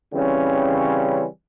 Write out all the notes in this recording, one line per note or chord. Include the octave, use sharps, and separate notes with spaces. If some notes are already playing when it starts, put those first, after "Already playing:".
C#3 E3 G3 C4 C#4